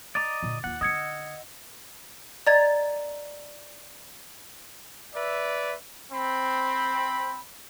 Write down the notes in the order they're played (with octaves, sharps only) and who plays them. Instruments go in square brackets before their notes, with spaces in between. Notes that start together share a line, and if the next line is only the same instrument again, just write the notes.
[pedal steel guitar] D5 D#5 A#5 [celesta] D6 A6
[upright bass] A#2 D3
[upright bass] D#2 F4 [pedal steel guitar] F#5
[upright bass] D3 D4 [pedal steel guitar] D#5 F#5 E6 [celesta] D#6 G#6 C#7
[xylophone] D5 D#5 A#5 G#6 A6
[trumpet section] B4 D5 E5
C4 B5